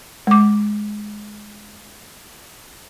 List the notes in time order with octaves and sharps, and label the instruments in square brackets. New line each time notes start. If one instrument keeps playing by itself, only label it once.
[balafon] G#3 D6